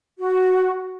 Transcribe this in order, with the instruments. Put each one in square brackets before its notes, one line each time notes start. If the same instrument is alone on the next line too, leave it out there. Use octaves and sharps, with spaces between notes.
[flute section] F#4